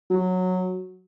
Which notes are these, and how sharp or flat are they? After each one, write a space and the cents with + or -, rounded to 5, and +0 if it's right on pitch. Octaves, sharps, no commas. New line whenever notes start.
F#3 -10